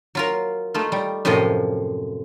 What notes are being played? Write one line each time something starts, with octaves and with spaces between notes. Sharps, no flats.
F#3 F4 A#4
A3 D#4 F4
G3
F#2 A2 C3 F3 F4 D#5